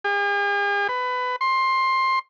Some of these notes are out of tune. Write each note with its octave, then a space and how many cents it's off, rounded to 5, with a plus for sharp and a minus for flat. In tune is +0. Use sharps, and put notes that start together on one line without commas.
G#4 -45
B4 +20
C6 +15